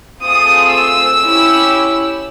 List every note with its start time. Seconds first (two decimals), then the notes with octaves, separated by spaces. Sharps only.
0.22 A3 C4 F4 G#4 D#6
0.72 E6
1.21 C#4 E4 G4